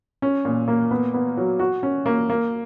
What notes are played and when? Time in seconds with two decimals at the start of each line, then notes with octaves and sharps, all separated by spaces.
0.22 C#4
0.45 A#2
0.68 A#3
0.91 B3
1.14 B3
1.37 F#3
1.59 F#4
1.83 C#4
2.06 A#3
2.30 A#3